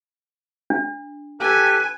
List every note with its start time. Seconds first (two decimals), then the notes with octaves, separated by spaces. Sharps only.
0.70 D4
1.40 G4 A4 B4 G#5